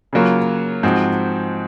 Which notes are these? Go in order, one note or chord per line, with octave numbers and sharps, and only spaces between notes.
C#3 F#3 A#3 F4
G#2 F3 C4 F#4